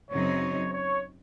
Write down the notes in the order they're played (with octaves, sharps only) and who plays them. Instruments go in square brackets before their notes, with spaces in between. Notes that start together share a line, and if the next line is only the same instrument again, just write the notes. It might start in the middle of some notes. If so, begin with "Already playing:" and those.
[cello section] F#2 C#3 F#3 C4 D#4 [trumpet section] C#5
[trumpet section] C#5